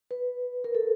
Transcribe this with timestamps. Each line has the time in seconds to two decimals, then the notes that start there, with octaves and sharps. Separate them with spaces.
0.11 B4
0.64 A#4
0.75 A4